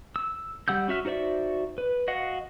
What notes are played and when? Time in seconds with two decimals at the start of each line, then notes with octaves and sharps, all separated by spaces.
0.16 E6
0.68 G3 F#5 E6 G6
0.88 C#4 F#4 E5 F6
1.05 D#4 F#4 C5 D5 E5
1.78 B4
2.08 F#4 D#5 F5 F#5